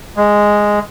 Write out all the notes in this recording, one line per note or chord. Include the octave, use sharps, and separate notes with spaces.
G#3